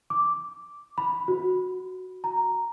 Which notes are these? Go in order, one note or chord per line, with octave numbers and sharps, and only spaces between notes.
D6
B5
F#4
A#5